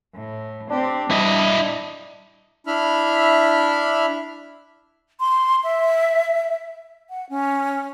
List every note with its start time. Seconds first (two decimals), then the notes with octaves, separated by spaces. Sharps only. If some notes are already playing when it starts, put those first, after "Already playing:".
0.15 A2
0.70 C4 D4 G4
1.11 G3 E4 D#5
2.67 D4 E4 E5 B5 F6
5.20 C6
5.64 E5
7.10 F#5
7.29 C#4